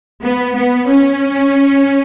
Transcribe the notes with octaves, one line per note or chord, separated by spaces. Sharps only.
B3
B3
C#4